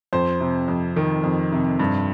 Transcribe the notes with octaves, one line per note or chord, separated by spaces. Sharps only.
F2 C5
C3
F2
D#3
F2
C3
G2